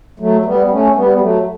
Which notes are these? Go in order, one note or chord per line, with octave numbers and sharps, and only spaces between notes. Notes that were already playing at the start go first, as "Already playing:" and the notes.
F#3 A3
G3 B3
A3 C#4
G3 B3
F#3 A3